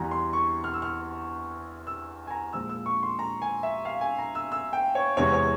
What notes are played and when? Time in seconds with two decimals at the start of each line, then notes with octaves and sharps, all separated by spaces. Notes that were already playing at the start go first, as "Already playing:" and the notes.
Already playing: E2 E3 G3 A#5
0.11 C6
0.33 C#6
0.64 F6
0.74 E6
0.82 F6
1.87 E6
2.27 G#5
2.31 A#5
2.53 A#2 F3 G#3 E6
2.69 E6
2.86 C#6
3.03 C6
3.19 A#5
3.42 G#5
3.63 E5
3.85 F5
4.01 G#5
4.18 A#5
4.35 E6
4.52 E6
4.73 G5
4.95 C#5
5.17 E2 C3 E3 G#3 C#5
5.33 C#5